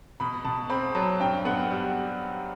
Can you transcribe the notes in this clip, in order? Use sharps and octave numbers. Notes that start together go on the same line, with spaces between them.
B2 B5
B2 A5
C4 B5
F#3 A5
G2 G5
B3 F#5
G3